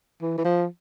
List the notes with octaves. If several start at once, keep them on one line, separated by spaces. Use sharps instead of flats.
E3
E3
F3